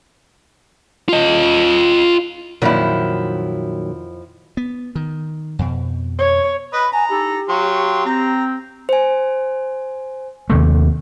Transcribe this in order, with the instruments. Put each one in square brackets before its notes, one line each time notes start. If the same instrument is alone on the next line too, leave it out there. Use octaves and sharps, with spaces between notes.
[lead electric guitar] F4 D#5
[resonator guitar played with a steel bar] F2 F3 E4 [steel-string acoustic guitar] A#2 D#3 F#3
[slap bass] B3
D#3
F2 B2
[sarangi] C#5
[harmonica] B4 D#5 [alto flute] B5
[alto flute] G#5 [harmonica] A#5
[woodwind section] D#4 E4 A4 [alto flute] G4
[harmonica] F#3 C6 [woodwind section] F5 G5 C#6
[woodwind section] C4 [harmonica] A#5
[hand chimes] C5 G#5
[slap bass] D#2 C3 A3